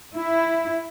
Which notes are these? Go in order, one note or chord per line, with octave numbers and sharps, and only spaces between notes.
E4